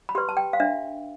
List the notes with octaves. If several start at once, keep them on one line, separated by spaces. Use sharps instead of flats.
B5
G4 B4 C6
A5
G5
F5
D4 E5